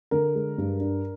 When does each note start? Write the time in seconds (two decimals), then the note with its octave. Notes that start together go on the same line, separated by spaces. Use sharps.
0.11 D3 A#4
0.35 G#3
0.58 G2
0.80 D4